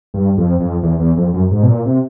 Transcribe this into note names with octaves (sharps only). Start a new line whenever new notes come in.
G2
F2
F2
E2
E2
F2
F#2
G#2
B2
A#2
C3